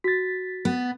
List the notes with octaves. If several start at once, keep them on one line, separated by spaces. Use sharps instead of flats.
F#4 A6 B6
B3